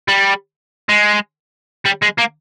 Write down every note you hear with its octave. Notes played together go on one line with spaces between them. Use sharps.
G3
G#3
G3
G#3
A#3